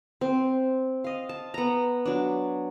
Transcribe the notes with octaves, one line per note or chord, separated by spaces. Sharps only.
C4
D#5 F5
A5
B3 A#5
F#3 D4